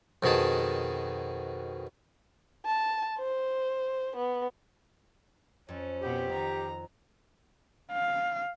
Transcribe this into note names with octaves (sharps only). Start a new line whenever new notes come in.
F2 B2 D#3 G#4 A5
A5
C5
B3
F2 C#4
B2 B3 C4 G4
D#3 A#5
F5